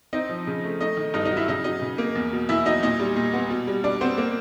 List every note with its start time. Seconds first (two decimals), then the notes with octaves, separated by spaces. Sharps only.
0.13 C4 D#4 D#5
0.29 F3
0.47 C#3
0.64 A3
0.81 A3 D#4 D#5
0.97 D#3
1.14 G2 D#4 D#5
1.25 D#4 D#5
1.31 F#3
1.37 E4 E5
1.48 C#3 D#4 D#5
1.64 F#3 D#4 D#5
1.82 C#3
1.98 A#3
2.15 E2
2.33 B2
2.49 E2 E4 E5
2.66 F#3 D#4 D#5
2.83 A#2 D#4 D#5
3.00 G3
3.16 A#2
3.33 B3
3.50 B2
3.67 G3
3.84 B2 D4 D5
4.01 B3 C4 C5
4.18 A#3